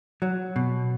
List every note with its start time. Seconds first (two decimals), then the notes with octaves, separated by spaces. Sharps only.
0.22 F#3
0.56 B2